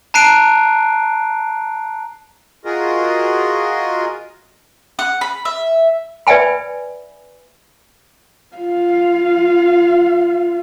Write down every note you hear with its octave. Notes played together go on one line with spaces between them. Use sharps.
A5 A#5 F#6 C7 D7 D#7
F4 F#4 G#4 A#4 D#5
F#5
B5
E5
B4 D5 E5 G5 G#5 B5
F4 F5